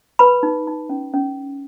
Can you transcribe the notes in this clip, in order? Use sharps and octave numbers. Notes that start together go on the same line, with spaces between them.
B4 B5
D#4
D#4
C#4
C#4